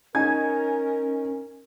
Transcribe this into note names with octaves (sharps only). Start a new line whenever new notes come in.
C#4 D#4 A#4 G#5 G#6